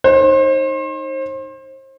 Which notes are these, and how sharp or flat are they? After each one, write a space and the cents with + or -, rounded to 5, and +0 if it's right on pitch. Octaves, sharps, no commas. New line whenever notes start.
D#4 +0 C5 +35